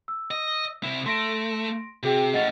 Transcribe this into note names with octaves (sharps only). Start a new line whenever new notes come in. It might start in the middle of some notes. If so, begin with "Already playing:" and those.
E6
D#5
C3 E4
A3 C6 A#6 D7
C3 F#4 G#4 G5
A2 C#4 D#5 F#5 A6